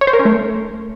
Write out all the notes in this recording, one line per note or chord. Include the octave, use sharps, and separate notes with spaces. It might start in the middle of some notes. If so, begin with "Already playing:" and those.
C#5
C5
A#4
C#4
A3